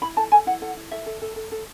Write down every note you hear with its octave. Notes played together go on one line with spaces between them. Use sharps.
E4 B5
A4 A5
A4 G#5
E4 F#5
A4 F#5
E4
A4 E5
A4
A4
A4
A4